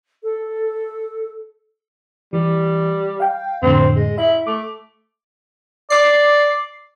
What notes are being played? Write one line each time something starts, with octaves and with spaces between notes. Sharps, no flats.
A4
E3 G3
F5 G5
F2 A2 D3 C4
G#3
E4 E5
A3 D6
D5 D6 C7